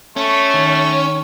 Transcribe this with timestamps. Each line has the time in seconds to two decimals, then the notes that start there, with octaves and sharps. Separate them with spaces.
0.17 A3 C#4 C#6
0.54 D#3